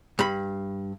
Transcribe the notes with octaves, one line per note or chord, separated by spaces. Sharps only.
G2 B5